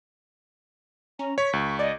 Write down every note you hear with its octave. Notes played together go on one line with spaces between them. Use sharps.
C#4 A#5
C#5 C#6 B6
C#2
D5 D#5